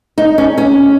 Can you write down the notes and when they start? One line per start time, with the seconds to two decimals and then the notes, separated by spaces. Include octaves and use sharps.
0.18 D#4
0.38 C#4
0.58 C#4